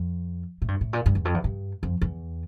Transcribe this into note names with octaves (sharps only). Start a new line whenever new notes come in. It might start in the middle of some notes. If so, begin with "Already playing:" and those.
Already playing: F2
A2
G2
A2
A#2
G2
E2
F2
E2
G2
F2
E2